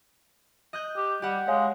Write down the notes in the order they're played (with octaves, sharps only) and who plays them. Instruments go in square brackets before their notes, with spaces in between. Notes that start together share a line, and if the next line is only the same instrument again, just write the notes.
[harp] D#5 F#6 G6
[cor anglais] G4
[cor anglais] G3 [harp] G4 F#5
[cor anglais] G#3 [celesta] C#5 F5 G#5